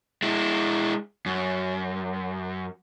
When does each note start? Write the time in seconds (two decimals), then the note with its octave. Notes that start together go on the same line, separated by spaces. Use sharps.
0.23 G#3 E4
1.26 F#2